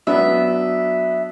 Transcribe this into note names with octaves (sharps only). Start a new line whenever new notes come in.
F#3 B3 D4 E5